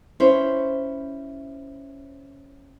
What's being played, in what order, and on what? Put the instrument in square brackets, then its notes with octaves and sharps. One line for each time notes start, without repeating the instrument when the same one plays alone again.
[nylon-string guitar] C#4 E4 C5